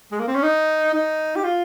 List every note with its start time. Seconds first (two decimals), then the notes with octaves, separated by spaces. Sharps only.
0.12 G#3
0.19 A#3
0.28 C4
0.35 C#4
0.43 D#4
0.93 D#4
1.36 G4
1.44 F4